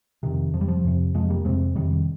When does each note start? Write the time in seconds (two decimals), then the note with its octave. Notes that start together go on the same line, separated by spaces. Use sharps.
0.23 F2 C3 D#3
0.54 F2 F3
0.58 C3 G3
0.68 F3
0.85 F2 C3
1.14 F2 C3 F3 G#3
1.30 G3 A#3
1.45 F2 C3 G#3 C4
1.76 F2 C3 D#3 G3